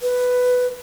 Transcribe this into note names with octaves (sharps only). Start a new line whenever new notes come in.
B4